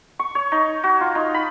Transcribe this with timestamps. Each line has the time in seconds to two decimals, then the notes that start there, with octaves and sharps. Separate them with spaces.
0.19 C#6
0.35 C#5
0.52 D#4
0.84 F#4
1.01 F4
1.15 D#4
1.34 B5